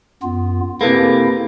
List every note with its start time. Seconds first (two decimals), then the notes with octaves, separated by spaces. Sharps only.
0.23 F#2 B3 F4
0.81 C3 A#3 E4 G#4 A4 B4